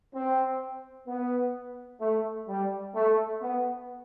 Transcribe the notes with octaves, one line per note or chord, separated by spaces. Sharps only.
C4
B3
A3
G3
A3
B3